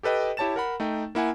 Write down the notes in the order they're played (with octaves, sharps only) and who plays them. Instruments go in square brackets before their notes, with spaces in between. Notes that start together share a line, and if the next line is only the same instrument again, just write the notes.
[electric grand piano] G4 A4 B4 D#5 G5
E4 G4 C#5 A5 A6 E7
A#4 F#5 B5
A3 D#4 G5
A#3 E4 F#5 G#5